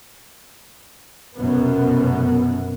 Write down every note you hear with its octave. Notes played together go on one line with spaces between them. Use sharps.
F1 F#2 B2 B3